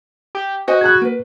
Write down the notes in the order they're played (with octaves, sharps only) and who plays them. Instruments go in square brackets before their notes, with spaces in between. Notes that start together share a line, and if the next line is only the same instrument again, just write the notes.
[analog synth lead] G4
[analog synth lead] F#4 [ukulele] C5 D#5 G#5
[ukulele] G#4 A#5 B5 [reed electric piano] F#6 G#6
[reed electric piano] A#3 [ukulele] A#4 B4